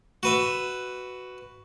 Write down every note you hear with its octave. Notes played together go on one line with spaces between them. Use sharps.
F#4 B4 E5